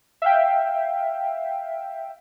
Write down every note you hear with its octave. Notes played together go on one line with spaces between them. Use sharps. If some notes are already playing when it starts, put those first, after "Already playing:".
E5 F5 G5